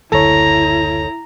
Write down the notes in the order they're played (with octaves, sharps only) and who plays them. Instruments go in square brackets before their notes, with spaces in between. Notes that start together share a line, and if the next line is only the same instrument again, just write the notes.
[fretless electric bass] F#1 D2 D3 [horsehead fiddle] E4 [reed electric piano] A4 C#5 [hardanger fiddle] A#5